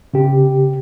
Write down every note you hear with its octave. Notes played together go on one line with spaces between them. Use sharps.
C#3 G4